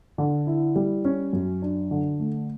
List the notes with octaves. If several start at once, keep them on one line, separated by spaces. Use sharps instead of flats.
D3
E4
G3
C#4
F#2
D4
D3
A3